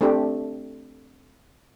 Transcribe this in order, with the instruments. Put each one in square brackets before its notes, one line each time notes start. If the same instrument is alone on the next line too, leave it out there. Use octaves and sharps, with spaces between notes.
[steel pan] A3 C4 D4 G4